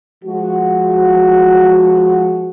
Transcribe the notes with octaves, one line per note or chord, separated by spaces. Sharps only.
F3 G#3 F#4